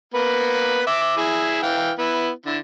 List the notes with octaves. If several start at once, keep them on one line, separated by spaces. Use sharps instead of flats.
A#3 B3 B4
E5 D6
E4 G#4
E3 F5 G5
B3 E4
D3 E4